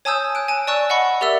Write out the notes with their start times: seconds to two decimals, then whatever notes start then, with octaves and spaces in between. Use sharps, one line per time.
0.05 C#5 G#5 A5 D#6 E6 G6
0.35 F#6 D7
0.48 G#5 A5 D7
0.67 D5 A5 C#6 E6 F#6
0.90 D#5 F#5 B5 C#6
1.21 G4 A#4 D5 E5 E6